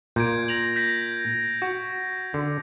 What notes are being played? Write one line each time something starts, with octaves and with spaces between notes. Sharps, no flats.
A#2 G6 G#6 D7
A#6 F7 F#7
G6 A#6 B6
F#4
D3